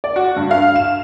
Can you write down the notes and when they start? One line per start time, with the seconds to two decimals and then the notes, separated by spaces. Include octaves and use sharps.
0.04 D5
0.16 F#4
0.36 G2
0.51 F5
0.76 E7